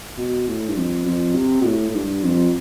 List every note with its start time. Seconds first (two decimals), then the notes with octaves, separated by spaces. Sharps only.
0.17 B2
0.47 A2
0.68 G2
0.77 F2
1.06 F2
1.35 C3
1.61 B2
1.65 A2
1.90 A2
1.95 G2
2.24 F2